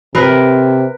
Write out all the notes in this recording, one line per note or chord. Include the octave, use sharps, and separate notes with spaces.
C3 A#4 B4